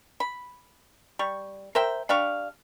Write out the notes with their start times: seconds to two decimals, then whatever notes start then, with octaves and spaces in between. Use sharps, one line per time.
0.20 B5
1.19 G3 C#6
1.75 A#4 C5 E5 G5
2.09 D4 G4 F5 C#6